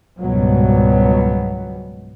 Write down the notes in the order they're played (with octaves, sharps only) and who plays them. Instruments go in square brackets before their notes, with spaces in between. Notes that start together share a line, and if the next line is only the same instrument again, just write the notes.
[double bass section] C#2 G#2 B2 F#3 G3 B3